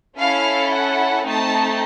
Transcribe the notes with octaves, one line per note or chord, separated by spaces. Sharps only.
C#4 E4 A4 F5
F#5
A3 C4 D#4 A5